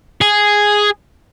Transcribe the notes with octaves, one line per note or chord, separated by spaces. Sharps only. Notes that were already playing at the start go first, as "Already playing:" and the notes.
G#4